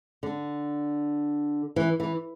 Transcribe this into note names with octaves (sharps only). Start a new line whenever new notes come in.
D3
E3
E3